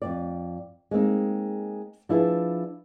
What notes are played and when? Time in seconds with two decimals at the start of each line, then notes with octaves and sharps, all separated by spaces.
0.02 F2 C3 D5
0.91 G#3 A#3 C4 D#4
2.09 F3 D4 E4 G#4 B4